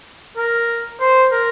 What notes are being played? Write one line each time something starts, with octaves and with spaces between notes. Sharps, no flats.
A#4
C5
A#4